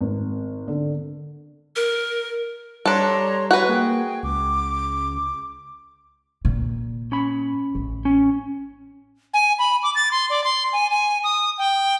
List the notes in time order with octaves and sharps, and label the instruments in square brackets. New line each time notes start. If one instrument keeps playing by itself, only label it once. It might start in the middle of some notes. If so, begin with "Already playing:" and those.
[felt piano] G#1
D3
[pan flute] A#4
[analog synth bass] G3 [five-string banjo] D4 A4 [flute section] C#5 A#5 C6
[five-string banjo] F#4 B4 [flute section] C#5
[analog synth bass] A#3 [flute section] G#4 G5
[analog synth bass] C#2 [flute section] D6
[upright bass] A#2
[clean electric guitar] C#4 B5
[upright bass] A1
[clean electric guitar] C#4
[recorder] G#5
B5
D6
A6
C6
D5
C6
G#5
G#5
D#6
G5